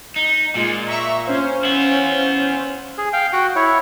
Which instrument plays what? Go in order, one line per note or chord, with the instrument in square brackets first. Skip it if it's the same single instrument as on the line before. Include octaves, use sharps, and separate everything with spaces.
[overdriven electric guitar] D#4
[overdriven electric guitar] A#2 [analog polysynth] G#3 F4
[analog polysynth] E5 A#5 C#6
C#4 C5 F5
[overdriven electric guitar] B3 E4
[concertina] G#4
F5 G5
F#4 F#5 G5
E4 C#5